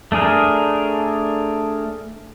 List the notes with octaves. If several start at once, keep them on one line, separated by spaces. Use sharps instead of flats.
A3 D4 G#4 A#4